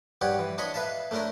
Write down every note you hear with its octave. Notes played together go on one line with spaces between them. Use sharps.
G2 G4 C#5 D5 F#5
E3
D4 C#5 D#5 B5 C#6
B4 E5 F5 A5
A3 C#4 D4 E4 A#4